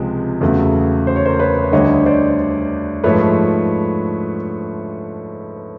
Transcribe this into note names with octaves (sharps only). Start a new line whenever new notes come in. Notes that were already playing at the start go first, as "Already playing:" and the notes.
Already playing: C#2 C3 F3 G#3
E2 C#3 F#3 A3
C5
C#5
A#4 C5
B4 C#5
D2 D3 G3 C#5 D#5
C5 D5
G#2 F3 A3 B4 C#5